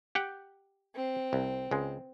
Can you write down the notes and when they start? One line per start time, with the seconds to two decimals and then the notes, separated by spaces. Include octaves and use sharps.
0.15 G4 F#5 G5
0.95 C4
1.33 C2
1.71 C#2 G#3